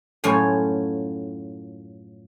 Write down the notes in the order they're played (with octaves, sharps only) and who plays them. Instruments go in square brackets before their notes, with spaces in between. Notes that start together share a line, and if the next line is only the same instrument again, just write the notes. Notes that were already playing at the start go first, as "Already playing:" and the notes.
[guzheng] F#2 A2 F3 C#5 G#5